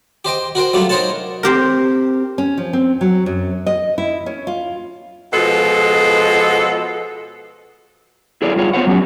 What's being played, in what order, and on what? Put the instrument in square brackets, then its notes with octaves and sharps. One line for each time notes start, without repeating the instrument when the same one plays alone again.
[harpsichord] G4 C5 D#5 G5
F#4 A#4 C5 G5
F#3 G3 A3 D4 F4
D#4 A#4 C5 C#5 F#5 A5
[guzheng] C4 G4 A#4
[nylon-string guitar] C#4
F3
C4
F#3
F#2
D#5
E4
C#4
F4
[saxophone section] B2 F3 G#3 A4
[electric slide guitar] E4 G#4 A4 C#5 D5
G2 F4 C#5
B3 C5 C#5 F#5
F#3 C#4 G4